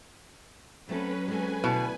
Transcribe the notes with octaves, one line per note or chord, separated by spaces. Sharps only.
F#3 A3 C4 C#4 A4 B4
G#3 C4 A4 B4 G#5
D2 B2 E4